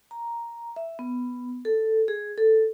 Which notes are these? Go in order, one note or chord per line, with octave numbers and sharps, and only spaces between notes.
A#5
E5
B3
A4
G#4
A4